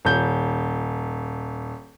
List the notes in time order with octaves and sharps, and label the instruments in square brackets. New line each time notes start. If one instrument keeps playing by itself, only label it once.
[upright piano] D#1 G6